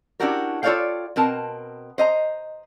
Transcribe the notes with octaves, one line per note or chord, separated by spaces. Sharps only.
C#4 D4 E4 F#4 G4 A#4
F4 A4 C#5 D5 F5 G5
B2 C4 A#4 A5
C5 D#5 A#5